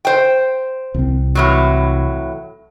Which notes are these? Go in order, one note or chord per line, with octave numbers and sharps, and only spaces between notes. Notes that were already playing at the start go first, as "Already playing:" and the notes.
C5 G5
C2 C4
A2 E3 F#3